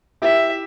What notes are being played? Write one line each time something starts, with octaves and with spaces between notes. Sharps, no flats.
E4 G4 E5